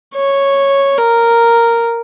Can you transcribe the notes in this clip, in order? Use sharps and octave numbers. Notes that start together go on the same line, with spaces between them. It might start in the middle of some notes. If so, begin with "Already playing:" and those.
C#5
A#4